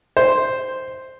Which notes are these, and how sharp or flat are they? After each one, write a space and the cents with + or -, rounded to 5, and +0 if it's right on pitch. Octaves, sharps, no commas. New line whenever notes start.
C5 +0